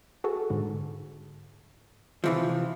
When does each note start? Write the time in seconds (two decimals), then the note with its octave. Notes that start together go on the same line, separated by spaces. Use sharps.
0.24 F#4 G#4 A4
0.50 G#2 D3
2.24 C3 E3 F3